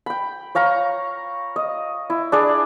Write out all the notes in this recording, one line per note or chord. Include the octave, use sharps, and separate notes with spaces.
G5 B5
C#5 F5 A#5 C#6
D#5
E4
D4 G#4 D5